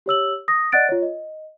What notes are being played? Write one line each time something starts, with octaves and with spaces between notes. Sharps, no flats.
G4 C#5 E6 F#7
D#6 A#6
D5 D#5 F#5 F#6 A6 D7
F4 C#5
D#5